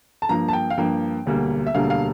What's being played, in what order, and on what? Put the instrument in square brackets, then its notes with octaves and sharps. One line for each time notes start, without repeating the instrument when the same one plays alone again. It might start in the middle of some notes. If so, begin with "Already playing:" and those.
[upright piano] A5
G2 F3 A#3 A#5
A5
G5
F5
G2 F3 A#3 G5
E1 D2 D3 G3 A#3
E5
E1 D2 D3 G3 A#3 F5
F5